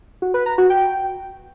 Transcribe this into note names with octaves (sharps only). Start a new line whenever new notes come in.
F#4
B4
A#5
F#4
G5